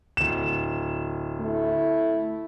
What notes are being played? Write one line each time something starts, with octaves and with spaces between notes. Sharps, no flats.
D1 E7
A3 E4